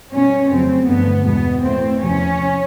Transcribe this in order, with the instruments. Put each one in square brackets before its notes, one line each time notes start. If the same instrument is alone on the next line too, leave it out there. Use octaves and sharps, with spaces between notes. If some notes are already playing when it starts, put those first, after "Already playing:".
[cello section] B2 G3 C#4
F2 C#3 F#3 A3 C4
G2 D3 F3 A3 B3
E2 B2 G#3 B3
A2 E3 A3 C4
E2 C3 F3 C#4